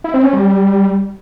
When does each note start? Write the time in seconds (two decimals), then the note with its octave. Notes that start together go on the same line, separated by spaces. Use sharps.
0.04 E4
0.14 C4
0.24 C#4
0.33 G3